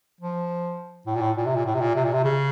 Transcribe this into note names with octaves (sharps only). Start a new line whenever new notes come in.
F3
A2
A#2
A2
A#2
C3
A#2
A2
C3
A#2
C3
A#2
C3
C#3